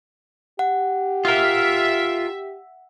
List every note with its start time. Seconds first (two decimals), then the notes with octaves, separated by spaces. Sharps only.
0.59 G4 F#5
1.25 F4 A#4 E5